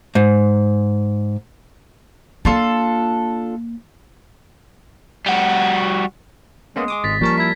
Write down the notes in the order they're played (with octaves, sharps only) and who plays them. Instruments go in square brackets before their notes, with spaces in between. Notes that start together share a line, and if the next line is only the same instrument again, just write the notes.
[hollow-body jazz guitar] G#2
[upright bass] A#3 [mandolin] D4 F4 A4
[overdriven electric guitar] G3 F#4
[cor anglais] G#3 [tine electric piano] A#3 B3 C#4
[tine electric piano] G#4 D6 D#6
[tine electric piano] G#1 [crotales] A6 B6
[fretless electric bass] F3 A#3 [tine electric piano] G3 A#4 A5 [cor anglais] C#4
[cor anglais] E4 [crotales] G#6 B6